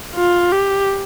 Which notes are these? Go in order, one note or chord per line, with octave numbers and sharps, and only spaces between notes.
F4
G4